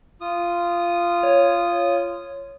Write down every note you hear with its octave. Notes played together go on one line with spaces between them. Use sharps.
F4 D#6
C#5